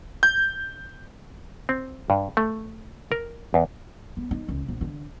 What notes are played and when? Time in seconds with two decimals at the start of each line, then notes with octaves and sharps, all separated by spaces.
0.23 G6
1.69 C4
2.10 G2
2.37 A3
3.12 A#4
3.54 E2
4.17 B3
4.31 D#4
4.48 C#2
4.68 A#1
4.81 D3